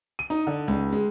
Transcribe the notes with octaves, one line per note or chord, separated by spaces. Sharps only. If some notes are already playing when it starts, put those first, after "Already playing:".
D#7
D#4
D3
C#2
G#3